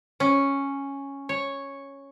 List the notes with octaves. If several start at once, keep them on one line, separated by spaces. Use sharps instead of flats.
C#4
C#5